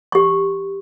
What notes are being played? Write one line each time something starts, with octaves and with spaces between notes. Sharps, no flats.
G4 C6